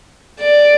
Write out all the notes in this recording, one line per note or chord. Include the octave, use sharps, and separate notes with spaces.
D5